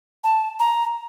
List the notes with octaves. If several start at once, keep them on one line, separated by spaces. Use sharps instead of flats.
A5
A#5